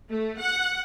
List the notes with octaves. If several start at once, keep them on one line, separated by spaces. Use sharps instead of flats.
A3
F#5